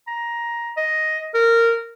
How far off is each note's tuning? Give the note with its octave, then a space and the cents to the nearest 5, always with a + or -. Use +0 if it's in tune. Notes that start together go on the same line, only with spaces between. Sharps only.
A#5 +15
D#5 +5
A#4 -15